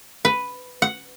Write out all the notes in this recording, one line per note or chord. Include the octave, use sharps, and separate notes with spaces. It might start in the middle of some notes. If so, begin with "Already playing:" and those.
B4
F#5